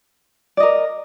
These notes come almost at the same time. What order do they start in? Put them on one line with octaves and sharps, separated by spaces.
D5 D#5 A#4